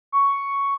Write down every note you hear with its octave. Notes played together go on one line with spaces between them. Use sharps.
C#6